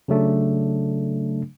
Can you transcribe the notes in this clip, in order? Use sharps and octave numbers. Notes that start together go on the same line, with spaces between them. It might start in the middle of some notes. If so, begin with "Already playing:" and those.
C#3 F#3 A3 D4